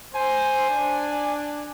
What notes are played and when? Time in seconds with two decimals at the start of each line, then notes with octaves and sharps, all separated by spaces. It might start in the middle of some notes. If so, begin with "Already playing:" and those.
0.15 C5 G#5
0.70 D4